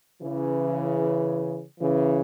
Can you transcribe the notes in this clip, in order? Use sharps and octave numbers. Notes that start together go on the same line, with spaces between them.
C#3 E3
C#3 E3